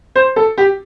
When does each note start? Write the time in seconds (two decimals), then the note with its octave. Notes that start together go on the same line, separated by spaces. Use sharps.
0.16 C5
0.36 A4
0.58 G4